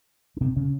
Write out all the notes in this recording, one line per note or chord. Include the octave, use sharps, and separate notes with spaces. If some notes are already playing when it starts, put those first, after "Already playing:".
C#4
C3 C4
C#3 C#4